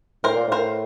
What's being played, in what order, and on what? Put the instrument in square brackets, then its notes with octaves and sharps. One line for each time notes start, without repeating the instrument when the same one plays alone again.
[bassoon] A2 [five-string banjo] A#4 C5
[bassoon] A#2
[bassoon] A2 [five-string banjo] A#4 C5